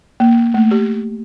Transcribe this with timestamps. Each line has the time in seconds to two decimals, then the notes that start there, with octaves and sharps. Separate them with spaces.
0.20 A#3
0.54 A3
0.71 G4